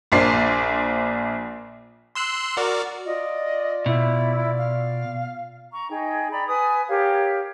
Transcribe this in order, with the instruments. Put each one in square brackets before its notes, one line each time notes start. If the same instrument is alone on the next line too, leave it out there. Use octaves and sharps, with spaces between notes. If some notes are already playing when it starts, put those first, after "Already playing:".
[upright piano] A#1 A#3 D4 C5 D5 C7
[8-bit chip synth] C6 E6 F#6
F#4 A#4 D5
[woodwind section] F4 D5 [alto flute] D#5
[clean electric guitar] B2 [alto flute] E4
[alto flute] F5
[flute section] A#5 C#6
D#4 G#4 G5
D5 G5 A#5 B5
B4 G#5 D#6
G4 A#4 C#5 F5